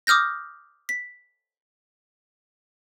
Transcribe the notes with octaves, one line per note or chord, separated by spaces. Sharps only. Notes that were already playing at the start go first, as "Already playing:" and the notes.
D6 D#6 F6 G6 A#6
B6